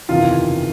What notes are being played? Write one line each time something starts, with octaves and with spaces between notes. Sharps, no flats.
F#1 E2 C3 D#3 F4